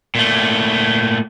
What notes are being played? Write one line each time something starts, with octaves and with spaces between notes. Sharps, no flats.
A#2 A3